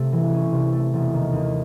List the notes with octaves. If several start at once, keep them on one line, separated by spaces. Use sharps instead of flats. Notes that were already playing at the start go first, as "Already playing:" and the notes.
Already playing: C3 A3
E3
C#4
C3
A3
E1
D#3
D#2